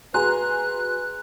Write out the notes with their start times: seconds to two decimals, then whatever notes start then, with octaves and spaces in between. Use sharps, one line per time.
0.14 F#4 G#4 B4 G#5 A#5 C6 F#6